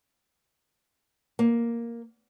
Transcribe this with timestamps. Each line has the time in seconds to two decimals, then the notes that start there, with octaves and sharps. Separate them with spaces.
1.39 A#3